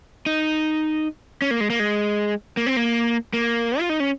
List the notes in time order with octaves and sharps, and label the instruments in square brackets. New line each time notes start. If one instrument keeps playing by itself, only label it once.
[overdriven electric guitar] D#4
C#4
A#3
G#3
A#3
G#3
A#3
C4
A#3
A#3
F4
D#4
C#4